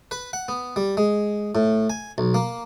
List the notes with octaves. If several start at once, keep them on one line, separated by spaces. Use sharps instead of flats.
B4
F#5
B3
G3
G#3
A2
G#5
B1
A#3